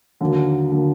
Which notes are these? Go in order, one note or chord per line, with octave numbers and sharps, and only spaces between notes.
D#2 D3 F#3 A#3
D3 F#3 A#3